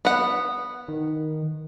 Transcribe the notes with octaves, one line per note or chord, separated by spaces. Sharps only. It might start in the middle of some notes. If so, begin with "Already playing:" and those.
B3 F#5
D#3